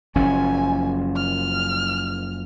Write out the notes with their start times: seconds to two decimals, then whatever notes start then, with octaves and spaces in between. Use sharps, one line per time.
0.16 F#1 F3 C#4 G#5
1.16 F6